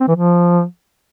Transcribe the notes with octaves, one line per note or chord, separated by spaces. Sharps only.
C4
E3
F3